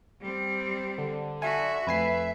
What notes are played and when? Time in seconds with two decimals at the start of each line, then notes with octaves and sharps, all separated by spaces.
0.21 G3 C4
0.98 D3
1.42 F#4 E5 G#5
1.87 F2 A3 B4 G#5 C7